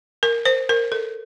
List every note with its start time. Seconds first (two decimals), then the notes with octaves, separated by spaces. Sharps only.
0.23 A#4
0.45 C5
0.69 A#4
0.92 A4